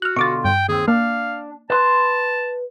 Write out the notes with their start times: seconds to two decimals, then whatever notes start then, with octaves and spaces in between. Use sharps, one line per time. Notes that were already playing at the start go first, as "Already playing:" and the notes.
0.02 F#4 F6 F#6
0.16 B2 D3 F4 C#6 D6 A6
0.45 G2 G5
0.69 D#2 C4 G#4
0.88 A#3 D4 F5
1.70 B4 A5 C6